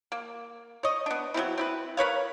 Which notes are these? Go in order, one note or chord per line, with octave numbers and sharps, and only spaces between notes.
A#3
C#5 D#5
B3 D4
F#3 G#3 C4 E4
C4 E4 B4
A#4 B4 C#5 F5